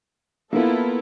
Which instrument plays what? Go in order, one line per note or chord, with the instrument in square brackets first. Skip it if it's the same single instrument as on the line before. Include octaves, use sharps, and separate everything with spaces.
[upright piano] A#3 B3 [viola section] E4 F4 A4